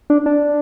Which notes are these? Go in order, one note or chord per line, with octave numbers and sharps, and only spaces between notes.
D4
D4